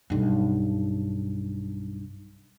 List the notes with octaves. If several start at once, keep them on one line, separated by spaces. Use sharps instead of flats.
B1 G2